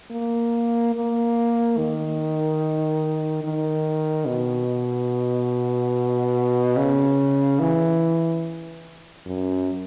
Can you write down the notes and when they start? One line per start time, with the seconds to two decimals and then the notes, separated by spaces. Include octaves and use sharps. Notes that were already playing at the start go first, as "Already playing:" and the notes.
0.11 A#3
0.95 A#3
1.77 D#3
3.44 D#3
4.27 B2
6.76 C#3
7.59 E3
9.26 F#2